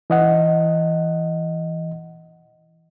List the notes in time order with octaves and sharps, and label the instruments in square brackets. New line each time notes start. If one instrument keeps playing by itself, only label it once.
[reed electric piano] E3 D#5 F#5